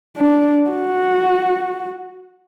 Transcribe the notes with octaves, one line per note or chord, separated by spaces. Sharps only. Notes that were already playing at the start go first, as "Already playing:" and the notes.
D4
F#4